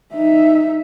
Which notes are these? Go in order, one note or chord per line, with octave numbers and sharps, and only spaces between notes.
D#4 E5